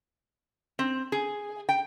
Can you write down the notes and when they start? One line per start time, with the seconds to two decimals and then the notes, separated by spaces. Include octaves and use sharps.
0.79 C4
1.12 G#4
1.69 G5